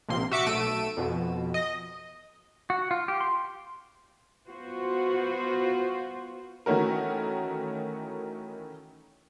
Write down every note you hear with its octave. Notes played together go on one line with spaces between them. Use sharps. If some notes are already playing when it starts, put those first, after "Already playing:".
A#1 C3 A#3 C6
F#4 E5 D6 C#7
B1 A3 E6 D7 D#7
F2 B2
D#5
F#4
F4
G4
C6
B3 F4 F#4 C5
D#3 E3 A3 C#4 F#4 A#4